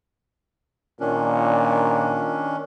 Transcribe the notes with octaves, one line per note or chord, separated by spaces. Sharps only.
A#2 D#3 C#4 D4